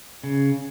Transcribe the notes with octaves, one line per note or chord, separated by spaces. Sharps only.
C#3